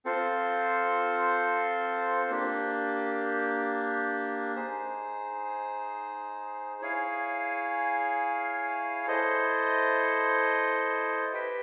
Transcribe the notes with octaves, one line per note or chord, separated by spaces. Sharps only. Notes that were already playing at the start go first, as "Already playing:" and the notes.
C4 F4 A4 C5
A#3 D4 G4
D#4 G#4 C5
E4 G#4 C#5 F5 G#5
E4 A4 C5 D#5
G4 B4 E5 G5